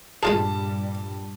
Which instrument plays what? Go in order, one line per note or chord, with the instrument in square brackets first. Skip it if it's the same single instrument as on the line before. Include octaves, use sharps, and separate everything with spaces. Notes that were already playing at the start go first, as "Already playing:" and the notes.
[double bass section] G2 A#2 G3 [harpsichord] G#3 F4 G#4 [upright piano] A5